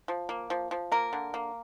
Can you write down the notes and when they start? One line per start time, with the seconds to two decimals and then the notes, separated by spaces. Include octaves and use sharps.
0.08 F3
0.29 A#3
0.50 F3
0.71 F3
0.92 A#3 A#4
1.13 D3
1.34 A#3